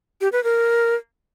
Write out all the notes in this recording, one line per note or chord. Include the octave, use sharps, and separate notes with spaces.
G4
B4
A#4